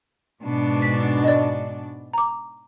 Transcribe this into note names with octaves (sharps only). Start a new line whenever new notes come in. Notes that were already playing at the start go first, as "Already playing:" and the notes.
G#2 B2 D4
B6
D5 D#5
A#5 D6